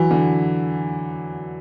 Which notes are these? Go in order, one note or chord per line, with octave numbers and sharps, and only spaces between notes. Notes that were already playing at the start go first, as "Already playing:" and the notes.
Already playing: E3 F#3
D3